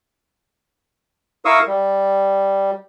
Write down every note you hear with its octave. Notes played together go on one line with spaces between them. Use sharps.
E4 A#4 F5 C#6 D#6 E6
G3